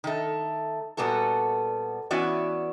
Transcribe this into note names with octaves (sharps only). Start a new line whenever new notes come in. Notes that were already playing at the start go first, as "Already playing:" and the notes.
D#3 A3
A#2 G3 B3 F#4 A4
E3 B3 C#4 E4 F#4 D5